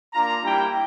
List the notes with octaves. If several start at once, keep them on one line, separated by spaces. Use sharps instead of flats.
A#3 D4 F4 A#5
G3 A#3 E4 G4 G5